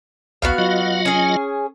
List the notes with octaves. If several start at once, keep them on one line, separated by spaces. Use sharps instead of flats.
A#1 D#2 B3 F#4 F5
F#3 F4 D#5
C#4 G#4